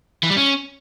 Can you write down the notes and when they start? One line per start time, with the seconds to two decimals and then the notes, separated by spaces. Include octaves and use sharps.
0.23 E3
0.30 G3
0.36 C#4